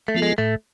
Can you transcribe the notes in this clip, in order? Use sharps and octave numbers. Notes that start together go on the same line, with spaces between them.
A3
F3 B3 F4 A4
G#3
A2 A3